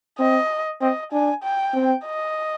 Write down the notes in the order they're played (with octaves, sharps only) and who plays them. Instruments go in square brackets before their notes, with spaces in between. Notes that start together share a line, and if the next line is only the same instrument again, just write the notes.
[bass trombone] C4 [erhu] D#5
[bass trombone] C4 [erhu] D#5
[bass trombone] D4 [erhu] G#5
[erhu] G5
[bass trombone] C4
[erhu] D#5